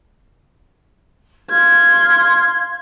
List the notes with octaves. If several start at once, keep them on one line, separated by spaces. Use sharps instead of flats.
F5 C6 F6 G#6